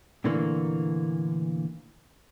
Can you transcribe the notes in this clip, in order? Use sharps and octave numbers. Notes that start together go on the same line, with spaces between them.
A#2 D3 E3 A3 A#3